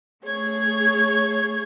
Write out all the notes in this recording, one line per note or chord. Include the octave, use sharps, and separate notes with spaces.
A3 G#4 C#5 G#6